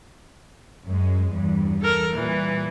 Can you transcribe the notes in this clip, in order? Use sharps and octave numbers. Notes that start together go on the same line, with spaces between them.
F#2 G#3
E2 G2
A4 A#4
A#2 E3 G3